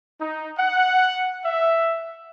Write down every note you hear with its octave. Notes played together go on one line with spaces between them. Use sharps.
D#4
F#5
E5